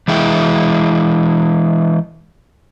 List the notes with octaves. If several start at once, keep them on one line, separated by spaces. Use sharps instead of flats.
E3 G#3 E4 G5